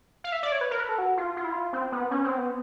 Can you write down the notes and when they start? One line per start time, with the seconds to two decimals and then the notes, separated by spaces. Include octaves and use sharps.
0.24 F5
0.32 E5
0.43 D5
0.52 C#5
0.61 B4
0.71 A#4
0.80 B4
0.89 A4
0.98 F#4
1.17 F4
1.37 F4
1.44 E4
1.52 F4
1.73 C4
1.92 B3
2.11 C#4
2.24 C4
2.38 B3